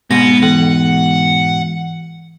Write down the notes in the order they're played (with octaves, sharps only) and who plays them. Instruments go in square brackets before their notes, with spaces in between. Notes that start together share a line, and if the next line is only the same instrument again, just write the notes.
[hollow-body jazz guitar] G#2 B2 [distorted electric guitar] B3 [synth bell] A#6
[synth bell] E3 [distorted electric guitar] F#5